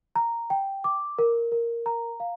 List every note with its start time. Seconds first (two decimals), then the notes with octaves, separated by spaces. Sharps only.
0.16 A#5
0.50 G5
0.84 D6
1.18 A#4
1.52 A#4
1.86 A#5
2.20 F5